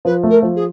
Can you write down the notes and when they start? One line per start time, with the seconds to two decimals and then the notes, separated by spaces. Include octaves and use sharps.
0.05 F3 B4
0.23 A3
0.30 A#4
0.42 F3
0.56 G#4